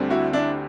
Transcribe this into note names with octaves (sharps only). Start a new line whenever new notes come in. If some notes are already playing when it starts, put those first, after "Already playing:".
Already playing: D2 D3 G3 C4
E4 F#4
D4 E4